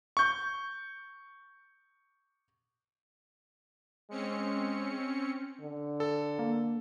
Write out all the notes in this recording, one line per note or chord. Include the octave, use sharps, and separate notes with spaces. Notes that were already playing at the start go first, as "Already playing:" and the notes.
C#6 G6
G#3 C4 C#4 C#7
D3
A4
A#3